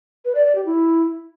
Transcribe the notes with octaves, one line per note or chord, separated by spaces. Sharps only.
B4
D5
D5
G4
E4